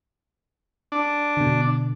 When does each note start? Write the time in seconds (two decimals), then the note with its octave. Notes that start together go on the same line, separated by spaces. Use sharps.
0.92 D4
1.37 B2 D3